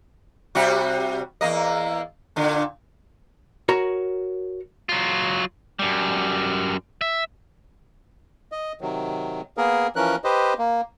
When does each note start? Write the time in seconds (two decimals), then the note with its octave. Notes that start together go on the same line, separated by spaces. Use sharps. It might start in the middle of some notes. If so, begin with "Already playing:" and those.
0.55 C3 G3 F#4
1.41 E2 A#3 D#5
2.36 A#2 D3
3.69 F#4 A#4 C#5 A#5
4.89 F#3 F4
5.79 F#2 G3
7.01 E5
8.52 D#5
8.81 C3 D#3 F#3
9.57 A#3 B3 G#4 A#4
9.96 E3 F3 C#4 A#4 F#6
10.24 G4 B4 C5 D#5
10.59 A#3